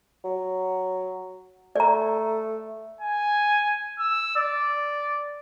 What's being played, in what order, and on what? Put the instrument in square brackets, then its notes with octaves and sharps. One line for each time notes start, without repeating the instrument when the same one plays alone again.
[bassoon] F#3
[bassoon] A3 [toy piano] D5 A#5
[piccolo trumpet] G#5
E6
D5